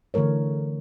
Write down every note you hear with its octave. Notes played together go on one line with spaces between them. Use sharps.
D3 E3 A3 A#4 C#5